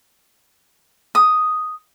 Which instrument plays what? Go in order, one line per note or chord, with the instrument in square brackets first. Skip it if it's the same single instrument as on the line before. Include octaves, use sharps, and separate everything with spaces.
[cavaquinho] D#6